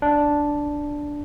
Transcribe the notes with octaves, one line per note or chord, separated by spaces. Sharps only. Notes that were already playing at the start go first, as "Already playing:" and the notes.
D4